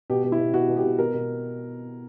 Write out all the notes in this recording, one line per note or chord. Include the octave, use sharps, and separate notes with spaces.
B2 G4
B2
E4
B2
B2 F#4
B2
G4
B2
B2 A#4
B2